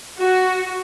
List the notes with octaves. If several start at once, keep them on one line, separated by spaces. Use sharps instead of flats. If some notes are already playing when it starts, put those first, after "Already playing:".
F#4